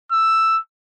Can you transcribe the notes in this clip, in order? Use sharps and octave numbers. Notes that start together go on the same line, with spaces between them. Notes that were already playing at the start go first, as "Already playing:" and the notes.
E6